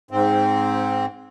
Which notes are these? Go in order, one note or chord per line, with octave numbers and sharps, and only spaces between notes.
G#2 C4